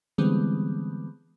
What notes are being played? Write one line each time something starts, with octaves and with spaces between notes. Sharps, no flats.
D3 E3 G3 G#3 B3 C4